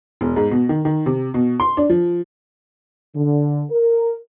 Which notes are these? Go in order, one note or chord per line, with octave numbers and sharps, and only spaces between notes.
E1
G#2
B2
D#3
D#3
C3
B2
C6
D4
F3
D3
A#4